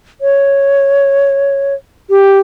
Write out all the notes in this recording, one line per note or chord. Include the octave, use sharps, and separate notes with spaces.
C#5
G4